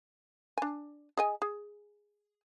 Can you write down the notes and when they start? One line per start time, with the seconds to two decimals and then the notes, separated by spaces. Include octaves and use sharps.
0.58 D4 G#5
1.17 G#4 D#5 G#5
1.42 G#4